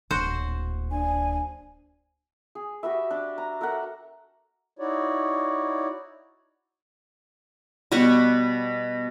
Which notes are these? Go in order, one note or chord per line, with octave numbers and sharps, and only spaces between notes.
D1 A#2 F#4 C5
D4 G#5
G#4
F#4 G4 B4 E5
D4
A#5
A4 A#4 E5 F#5
D#4 E4 F#4 C#5 D5
B2 G3 F#5 C#6